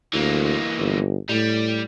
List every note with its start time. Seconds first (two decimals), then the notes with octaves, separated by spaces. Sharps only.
0.14 D2 E3 A#3
0.79 G1
1.29 A2 G3